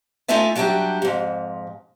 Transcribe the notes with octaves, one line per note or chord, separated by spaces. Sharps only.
A3 D#4 F4 A4 E5 G#5
F#3 G3 D4 E4 F#4 G4
F2 G#2